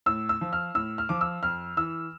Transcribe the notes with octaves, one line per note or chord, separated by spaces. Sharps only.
A2 E6
E6
F3
F6
A2 E6
F6
F3 D6
E6
F2 F6
E3 E6